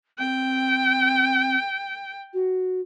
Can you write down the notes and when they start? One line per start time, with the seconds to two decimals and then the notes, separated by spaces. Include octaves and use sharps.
0.19 C4 G5
2.34 F#4